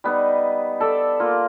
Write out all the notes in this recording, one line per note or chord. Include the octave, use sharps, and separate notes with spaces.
G3 B3 D#4 D#5
A4 D5 E5
A#3 F4